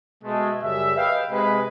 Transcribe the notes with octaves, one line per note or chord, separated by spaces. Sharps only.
B2 G#3 A3
F#2 C#3 G3 G#4 E5
B4 D#5 F5 G5
C3 G#3 B4